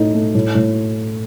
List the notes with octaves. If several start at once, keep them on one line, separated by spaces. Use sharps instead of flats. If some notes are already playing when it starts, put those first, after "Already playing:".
Already playing: A2 D#4 A4
A3
A2
A2